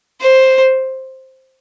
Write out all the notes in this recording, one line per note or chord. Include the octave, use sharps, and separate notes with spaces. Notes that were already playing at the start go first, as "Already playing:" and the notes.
C5